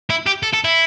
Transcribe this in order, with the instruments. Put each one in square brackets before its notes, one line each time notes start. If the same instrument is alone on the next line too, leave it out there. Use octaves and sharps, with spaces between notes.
[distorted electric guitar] E4
G4
A4
A4
E4